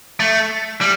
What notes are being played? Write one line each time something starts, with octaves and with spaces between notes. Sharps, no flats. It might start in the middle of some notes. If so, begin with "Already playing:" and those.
A3
G3